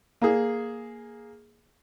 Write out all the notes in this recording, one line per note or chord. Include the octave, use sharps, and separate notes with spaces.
A#3 G#4